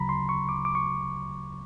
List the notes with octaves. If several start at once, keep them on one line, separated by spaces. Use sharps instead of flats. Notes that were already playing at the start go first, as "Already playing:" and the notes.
Already playing: D2 C#3 F#3 A#5 B5
C6
C#6
D6
D6
C#6